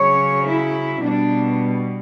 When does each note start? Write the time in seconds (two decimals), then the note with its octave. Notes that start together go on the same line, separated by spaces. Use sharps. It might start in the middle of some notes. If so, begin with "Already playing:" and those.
Already playing: C#3 F#3 C#5
0.46 E4
1.03 B2 G3 D4